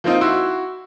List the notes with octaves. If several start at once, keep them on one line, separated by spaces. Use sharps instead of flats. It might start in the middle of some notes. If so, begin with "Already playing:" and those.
F3 A#3 C4 D#4 F4
E4 F#4 C6 E6